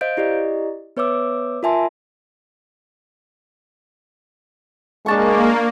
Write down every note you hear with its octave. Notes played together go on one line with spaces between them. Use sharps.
C5 D#5 F5 G6 D7
E4 G4 D5 D#5
B3 B4 C#5 E5 D6 E6
F4 A#4 E5 G#5 A5 C6
G#3 A#3 D4 A5 C#6